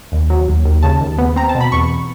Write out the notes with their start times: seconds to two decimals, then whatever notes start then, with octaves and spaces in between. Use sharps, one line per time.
0.12 D#2
0.30 F#3
0.48 D#2
0.65 D#2
0.83 C#3 A5
1.01 D#2
1.18 B3
1.36 C4 A#5
1.49 A5
1.55 B2
1.61 B5
1.72 E2 C#6